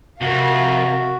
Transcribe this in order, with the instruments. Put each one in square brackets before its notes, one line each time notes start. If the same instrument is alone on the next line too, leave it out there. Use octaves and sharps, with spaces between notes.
[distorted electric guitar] F2 [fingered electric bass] C3 [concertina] F#4 [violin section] A#4 E5 F5